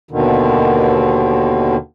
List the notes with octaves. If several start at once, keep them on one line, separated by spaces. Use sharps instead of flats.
D#2 B2 D3 D#3